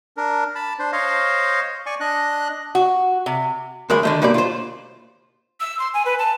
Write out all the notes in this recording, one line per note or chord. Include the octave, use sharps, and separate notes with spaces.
D4 A#4
A5 B5
D4 C5
C5 C#5 D#5 F5
D5 G#5 C#6
D4 D#5 F#6
F#4
C3
D2 G#3 A#4 B5
D3 D#3 A3
G2 B2 G3 A#3 D5
F4 C5
E6
C6
G#5
B4
A5